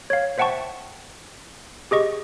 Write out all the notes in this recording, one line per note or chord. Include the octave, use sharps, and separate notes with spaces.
C#5 F5
C5 E5 F#5 G5 A5 C#6
G4 G#4 D#5 C#6